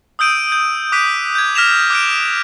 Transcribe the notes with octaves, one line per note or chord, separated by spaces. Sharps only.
D#6 E6 G6 D7 D#7
G6
D6 F#6 B6 D7 D#7
G6 G#6
F6 A#6 B6 E7 F7
D6 F#6 G6 D7